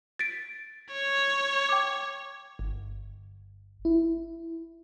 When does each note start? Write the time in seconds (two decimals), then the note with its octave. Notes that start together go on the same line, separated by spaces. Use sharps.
0.19 A6 B6 D7
0.92 C#5
1.69 G5 D6
2.59 G1
3.85 E4